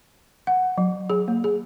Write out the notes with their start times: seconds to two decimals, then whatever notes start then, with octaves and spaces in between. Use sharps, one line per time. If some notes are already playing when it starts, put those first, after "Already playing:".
0.47 F#5
0.78 F#3
1.10 G#4
1.28 A#3
1.44 G#4